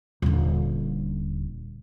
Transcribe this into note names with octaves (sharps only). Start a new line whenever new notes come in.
D#1 D3